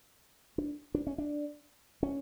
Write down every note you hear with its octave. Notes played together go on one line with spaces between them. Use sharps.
D4
D4
C#4
D4
C#4